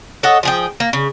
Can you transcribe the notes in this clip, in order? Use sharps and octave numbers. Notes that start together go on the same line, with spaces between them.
A4 C#5 D#5 F#5
F3 G#4 G5
A#3
C#3